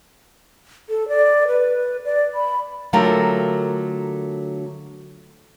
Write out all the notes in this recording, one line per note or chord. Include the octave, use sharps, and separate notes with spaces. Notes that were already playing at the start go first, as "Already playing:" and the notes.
A4
D5
B4
D5
B5
D3 F#3 A3 F4 G4 A#4